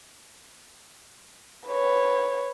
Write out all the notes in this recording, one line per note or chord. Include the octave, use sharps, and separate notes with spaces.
B4 C#5